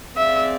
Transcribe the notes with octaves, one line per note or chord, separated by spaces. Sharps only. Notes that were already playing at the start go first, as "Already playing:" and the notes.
C4 G#4 D5 E5 F5